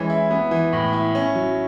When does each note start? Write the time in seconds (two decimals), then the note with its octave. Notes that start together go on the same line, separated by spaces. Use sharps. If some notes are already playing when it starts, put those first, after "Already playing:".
Already playing: E3 G#3 C#4
0.10 E4
0.31 B3
0.51 E3
0.73 A2
0.93 E4
1.15 C#4
1.35 F#3